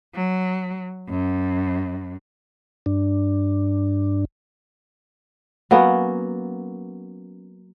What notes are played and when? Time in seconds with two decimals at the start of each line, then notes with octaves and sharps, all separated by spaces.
0.15 F#3
1.09 F#2
2.86 G2 D4
5.71 F#3 A#3 B3 C#4